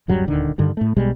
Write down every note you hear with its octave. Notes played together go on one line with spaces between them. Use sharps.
D1 F#2 F#3 G3
D#1 D2 D3 D#3
G2 D3 D#3 G3
A2 A3
B1 B2 G3 G#3